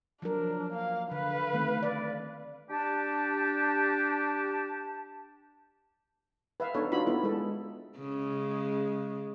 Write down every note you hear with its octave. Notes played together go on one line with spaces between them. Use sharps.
F3 F#3 D4 A#4
A#3 F5
D3 B4 F5
D#3 A3 C4
D5
D4 G4 A5
B4 E5 F5
B3 D4 D#4 A4 B4 C#5
D4 D#4 F4 F#4 B5
B3 E4 A4
G#3 A4
C#3 G#3